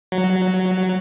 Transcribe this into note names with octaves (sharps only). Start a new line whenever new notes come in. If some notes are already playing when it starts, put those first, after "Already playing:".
F#3